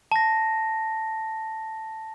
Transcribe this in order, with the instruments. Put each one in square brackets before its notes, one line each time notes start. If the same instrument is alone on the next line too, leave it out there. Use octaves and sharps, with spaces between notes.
[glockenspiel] A5 A#6